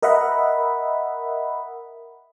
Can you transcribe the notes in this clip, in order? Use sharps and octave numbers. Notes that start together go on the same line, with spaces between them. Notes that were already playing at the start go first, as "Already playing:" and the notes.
A#4 D#5 E5 F#5 B5